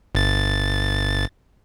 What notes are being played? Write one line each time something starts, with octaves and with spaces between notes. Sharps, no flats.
G1 A6